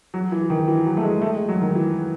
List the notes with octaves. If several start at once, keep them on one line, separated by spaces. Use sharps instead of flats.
F#3
E3
D#3
E3
F#3
A3
G#3
A3
G#3
F#3
D#3
E3